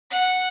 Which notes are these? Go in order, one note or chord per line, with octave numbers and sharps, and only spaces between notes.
F#5